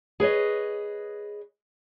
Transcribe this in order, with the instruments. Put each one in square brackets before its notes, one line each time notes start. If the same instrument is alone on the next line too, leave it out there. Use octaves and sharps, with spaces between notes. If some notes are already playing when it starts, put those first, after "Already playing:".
[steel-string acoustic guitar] G#4 B4 C#5 D#5